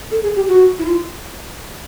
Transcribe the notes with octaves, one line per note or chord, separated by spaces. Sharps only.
A4
G#4
G4
F#4
E4
F4